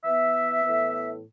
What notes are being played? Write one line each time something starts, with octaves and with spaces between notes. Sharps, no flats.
E3 B3 E5
A2 E3 B3